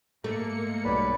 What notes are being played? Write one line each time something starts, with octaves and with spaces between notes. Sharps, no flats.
G#2 A3 A#3 C#7
B1 G3 B4 D5 B5